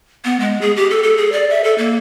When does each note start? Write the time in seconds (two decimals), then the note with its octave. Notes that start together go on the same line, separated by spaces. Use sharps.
0.25 B3
0.40 G#3
0.61 G#4
0.76 G4
0.90 A4
1.03 A4
1.17 G#4
1.32 D5
1.50 E5
1.64 A4
1.78 A#3